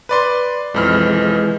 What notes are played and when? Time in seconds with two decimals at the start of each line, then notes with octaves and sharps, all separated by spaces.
0.09 B4 D5 C6
0.74 B1 F2 E3 G#3 F6